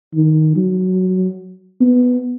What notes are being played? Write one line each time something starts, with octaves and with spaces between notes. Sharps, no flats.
D#3
F#3
B3